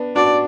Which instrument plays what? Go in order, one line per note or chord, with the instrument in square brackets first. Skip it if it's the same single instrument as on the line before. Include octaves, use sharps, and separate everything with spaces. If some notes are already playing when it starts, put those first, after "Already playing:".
Already playing: [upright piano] B3 D4
[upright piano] D4 F#4 [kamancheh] D5